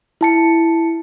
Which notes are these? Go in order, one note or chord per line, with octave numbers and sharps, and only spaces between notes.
E4 A5 C#7